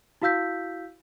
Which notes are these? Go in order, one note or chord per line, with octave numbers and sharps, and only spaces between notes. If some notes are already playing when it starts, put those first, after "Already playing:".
E4 F#4 F5 E6 G6 B6